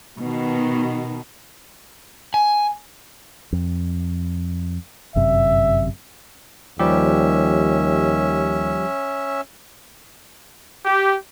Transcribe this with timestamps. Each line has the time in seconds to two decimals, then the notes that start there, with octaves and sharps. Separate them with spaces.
0.20 B2 D#3
2.34 G#5
3.53 F2
5.16 G1 F#2 C3 E5
6.79 D#2 F3 G3 C#4 G4 E5
10.84 G4